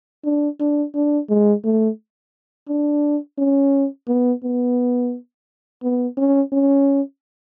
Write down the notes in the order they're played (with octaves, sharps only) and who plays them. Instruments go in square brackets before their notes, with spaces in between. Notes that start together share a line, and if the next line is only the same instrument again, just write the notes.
[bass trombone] D4
D4
D4
G#3
A3
D4
C#4
B3
B3
B3
C#4
C#4